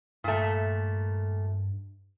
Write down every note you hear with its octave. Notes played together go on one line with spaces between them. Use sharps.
G2 A#2 A3